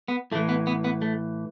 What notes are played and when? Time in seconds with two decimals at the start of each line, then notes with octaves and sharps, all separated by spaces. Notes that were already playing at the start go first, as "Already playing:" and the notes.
0.08 B3
0.32 A2 A3
0.35 E3
0.49 B3
0.67 B3
0.84 B3
1.02 A3